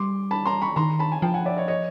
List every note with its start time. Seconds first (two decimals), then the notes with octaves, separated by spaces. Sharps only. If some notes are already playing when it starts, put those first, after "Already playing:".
Already playing: G3 C6 D6
0.31 A5 B5
0.46 A#5 C6
0.62 B5 C#6
0.76 D#3 A#5 C6
0.99 A5 B5
1.12 G#5
1.22 F3 G5 A5
1.34 F#5 G#5
1.45 D5 E5
1.57 C#5 D#5
1.68 C#5 D#5